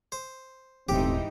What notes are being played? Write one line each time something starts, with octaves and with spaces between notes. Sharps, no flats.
C5
D#1 A1 G#2 E3 C4 D#4 G4